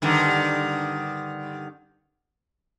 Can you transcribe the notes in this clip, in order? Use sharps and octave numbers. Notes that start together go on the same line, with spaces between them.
G2 D3 D#3